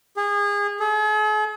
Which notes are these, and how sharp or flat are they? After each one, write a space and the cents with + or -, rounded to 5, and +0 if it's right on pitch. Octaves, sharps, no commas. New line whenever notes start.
G#4 -30
G#4 +45